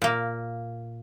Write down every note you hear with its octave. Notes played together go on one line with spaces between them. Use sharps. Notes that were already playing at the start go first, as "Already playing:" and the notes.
A#2 A#3